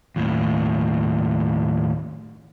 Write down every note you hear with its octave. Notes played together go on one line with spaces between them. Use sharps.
D#2 A2